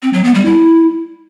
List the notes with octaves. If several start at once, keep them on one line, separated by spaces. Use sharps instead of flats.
C4
F#3
B3
G3
E4